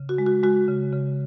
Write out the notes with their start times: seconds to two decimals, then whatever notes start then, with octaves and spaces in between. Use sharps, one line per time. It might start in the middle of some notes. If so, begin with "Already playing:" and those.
Already playing: C#3
0.09 F#4
0.18 G#3
0.26 F#4
0.43 G#3 F#4
0.68 C#3
0.93 C#3